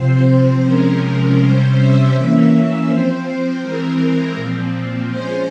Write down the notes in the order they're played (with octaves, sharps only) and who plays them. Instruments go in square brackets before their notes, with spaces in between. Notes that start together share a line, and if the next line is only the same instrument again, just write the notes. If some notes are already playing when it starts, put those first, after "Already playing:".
Already playing: [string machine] C3 F3 C4 C5
C3 F3 G#3 C#4 A#4
C3 G3 C#4 C5
E5
E3 A#3 C#4 E5
F3 C4 C5
E3 G#3 C4 A#4
A#2 F3 C4
F3 G#3 C#4 C5